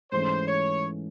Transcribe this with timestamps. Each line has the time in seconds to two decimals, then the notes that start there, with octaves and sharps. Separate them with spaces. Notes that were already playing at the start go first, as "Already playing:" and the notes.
0.12 G#2 E3 A3 C#4 C5
0.48 C#5